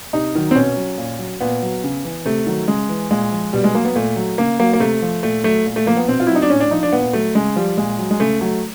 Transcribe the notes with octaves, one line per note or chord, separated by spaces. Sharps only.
C3 D#4
D#3 F#3
C4
B2 C#4
F#3
A#2
F#3
A#2 B3
F#3
C#3
E3
C3 A3
D#3 F#3
C#3 G#3
E3
A#2 G#3
F3
B2 G3
G#3
F#3 A#3
B3
A#2 A3
F#3
C#3 A#3
F#3 A#3
A#3
C3 A3
F3
A#2 A3
F#3 A3
A#2
A3
F3 A#3
B3
B2 C4
F4
E4
F#3
D#4
D4
A2 C#4
D4
F3 D#4
D4
A#2 B3
F#3 A3
C#3 G#3
F3 G3
A#2 G#3
F#3
G#3
C#3 A3
F#3 A3